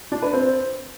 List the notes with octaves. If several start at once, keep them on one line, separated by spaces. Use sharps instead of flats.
D4
B4
C4